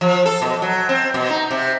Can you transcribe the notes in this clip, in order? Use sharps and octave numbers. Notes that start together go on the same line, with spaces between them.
F3
A4
B2
F#3
C4
B2
D#4
C3